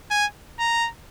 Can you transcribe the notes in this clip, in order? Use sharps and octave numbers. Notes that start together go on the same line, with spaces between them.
G#5
A#5